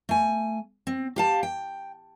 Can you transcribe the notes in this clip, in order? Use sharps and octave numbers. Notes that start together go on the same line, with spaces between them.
A3 G#5
C4
G4 F5 A5
G5